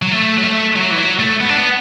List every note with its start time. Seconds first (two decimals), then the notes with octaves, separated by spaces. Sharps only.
0.02 F#3
0.12 A3
0.38 F#3
0.43 A3
0.76 F#3
0.91 E3
0.98 F#3
1.19 A3
1.40 B3
1.49 D4
1.58 B3